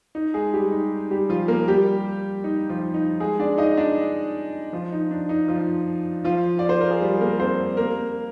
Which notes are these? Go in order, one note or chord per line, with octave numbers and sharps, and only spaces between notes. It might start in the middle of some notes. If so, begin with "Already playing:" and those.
D#4
G#3 G#4
G3 G4
D#4
G3 G4
F3 F4
A#3 A#4
G3 G4
D#4
F3 F4
D#4
G#3 G#4
D4 D5
D#4 D#5
D4 D5
F3 F4
D#4
D4
D#4
F3 F4
F3 F4
D5
C5
A#4
G#4
G3 G4
G#4
A#3 A#4
C4 C5
A#3 A#4